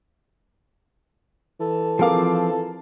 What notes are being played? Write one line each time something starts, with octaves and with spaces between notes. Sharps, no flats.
E3 A4
F3 C4 G#4 A#4 F5 D6